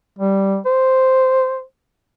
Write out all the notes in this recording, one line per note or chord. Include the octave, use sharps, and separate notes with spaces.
G3
C5